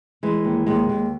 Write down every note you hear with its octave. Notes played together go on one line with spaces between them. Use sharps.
E3 G#3
D#2
D#2 G#3
D#2